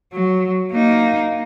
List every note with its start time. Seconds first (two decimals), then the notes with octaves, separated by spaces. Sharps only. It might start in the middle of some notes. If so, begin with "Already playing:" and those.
0.13 F#3
0.72 A#3 D#4